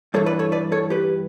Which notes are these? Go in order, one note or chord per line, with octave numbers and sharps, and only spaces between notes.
G2 E3 A4 C#5
B4 D5
A4 C#5
B4 D5
A4 C#5
G4 B4